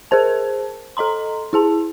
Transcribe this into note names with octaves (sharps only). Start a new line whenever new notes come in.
G#4 A#4 C5 A5
A4 D#5 A#5 C6
E4 G#4 A5